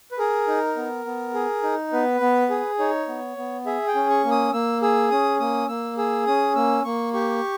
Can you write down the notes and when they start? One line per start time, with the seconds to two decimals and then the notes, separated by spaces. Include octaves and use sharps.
0.12 B4
0.18 G#4 A#4
0.48 D#4
0.76 B3
1.05 B3
1.34 G#4
1.63 D#4
1.93 B3 B4
2.21 B3
2.50 G#4
2.79 D#4 C#5
3.08 B3
3.37 B3
3.66 G#4 E5
3.88 G5
3.95 C#4
4.10 C#6
4.24 A#3
4.31 D#6
4.53 A#3 E6
4.82 G#4 E6
5.11 C#4 D#6
5.40 A#3 D#6
5.68 A#3 E6
5.97 G#4 E6
6.27 C#4 D#6
6.55 A#3 E6
6.84 A#3 C#6
7.13 G4 C#6